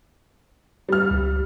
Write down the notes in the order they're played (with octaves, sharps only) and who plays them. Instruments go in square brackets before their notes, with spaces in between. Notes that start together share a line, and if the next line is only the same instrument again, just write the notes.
[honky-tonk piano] G3 F6
[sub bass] C#2